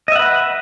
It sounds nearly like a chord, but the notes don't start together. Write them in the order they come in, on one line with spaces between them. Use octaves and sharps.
D#5 E5 F#5 B4